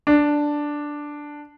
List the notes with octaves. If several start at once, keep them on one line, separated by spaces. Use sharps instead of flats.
D4